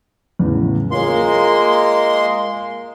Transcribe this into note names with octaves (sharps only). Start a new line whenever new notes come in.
E2 A2 C#3
G#3 A#3 F4 C#5 C6